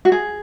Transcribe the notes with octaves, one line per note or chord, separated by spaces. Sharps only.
F#4
G#4